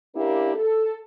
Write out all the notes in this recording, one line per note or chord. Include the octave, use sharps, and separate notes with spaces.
A#3 C#4 D4 E4 G4 A#4
A4